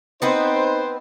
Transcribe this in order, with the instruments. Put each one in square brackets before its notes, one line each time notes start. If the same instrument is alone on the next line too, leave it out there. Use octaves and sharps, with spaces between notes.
[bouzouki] B3 C4 B4 [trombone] D#4 [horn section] C5